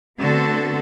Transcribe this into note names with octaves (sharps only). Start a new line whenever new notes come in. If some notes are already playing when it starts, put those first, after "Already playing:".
D3 A3 B3 C4 F#4 A4